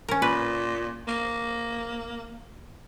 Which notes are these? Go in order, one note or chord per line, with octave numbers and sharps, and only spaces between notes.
C#4 A#4
A#2 B4
A#3